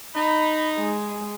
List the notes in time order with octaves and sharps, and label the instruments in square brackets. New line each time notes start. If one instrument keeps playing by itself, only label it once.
[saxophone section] D#4 [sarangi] B5
[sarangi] G#3